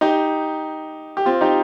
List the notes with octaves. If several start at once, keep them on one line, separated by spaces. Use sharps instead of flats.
D#4 G4
G4
C4 F4
D#4 G4